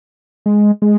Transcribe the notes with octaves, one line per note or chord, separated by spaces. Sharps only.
G#3
G#3